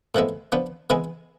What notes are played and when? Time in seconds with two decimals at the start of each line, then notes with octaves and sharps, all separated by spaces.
0.15 A2 F3 G#3 B3 E4
0.52 F3 B3 D4
0.90 E3 G#3 B3 E4 G#4